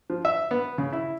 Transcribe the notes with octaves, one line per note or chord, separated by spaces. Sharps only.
F3
E5
B3
C#3
E4